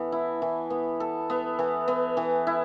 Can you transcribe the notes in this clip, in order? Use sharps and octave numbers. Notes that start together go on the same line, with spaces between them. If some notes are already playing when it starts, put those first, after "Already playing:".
Already playing: E3 B3 A4
E4
E3
B3
A4
B3
E3
B3
E3
E4